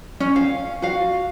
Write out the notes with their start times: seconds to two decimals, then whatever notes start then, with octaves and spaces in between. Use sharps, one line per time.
0.20 C#4
0.36 F5
0.82 F#4 F5